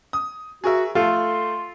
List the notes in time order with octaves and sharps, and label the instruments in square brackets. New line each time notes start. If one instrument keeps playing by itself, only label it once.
[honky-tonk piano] D#6
[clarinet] F#4 [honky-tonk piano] G#4 A#4 E5
[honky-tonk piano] A3 [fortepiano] F4 A4 [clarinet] C6